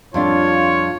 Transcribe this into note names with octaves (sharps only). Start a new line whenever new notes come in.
F2 G3 D4 F4 C#5